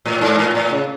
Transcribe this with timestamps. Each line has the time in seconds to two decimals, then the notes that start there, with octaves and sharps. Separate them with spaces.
0.05 A2
0.21 G#2
0.38 A2
0.55 A2
0.71 C#3